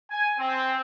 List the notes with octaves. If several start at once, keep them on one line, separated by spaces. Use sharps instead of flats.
G#5
C4